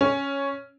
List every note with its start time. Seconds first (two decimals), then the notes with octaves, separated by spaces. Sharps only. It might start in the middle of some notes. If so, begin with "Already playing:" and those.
0.01 C#4